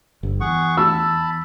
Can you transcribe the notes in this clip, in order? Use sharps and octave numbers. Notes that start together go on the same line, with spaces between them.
G1
E2 G#4 F#5 C#6
A5 B5 E6